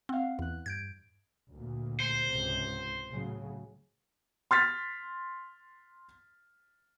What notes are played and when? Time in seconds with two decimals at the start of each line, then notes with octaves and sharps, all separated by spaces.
0.09 C4 F5 F#5
0.39 E2 E3 F#6
0.66 G2 G6 G#6 D7
1.53 D2 A#2
2.00 C5
2.28 C#2 G#2 C3
3.10 A2 C#3 F#3
4.51 C6 F6 A6 B6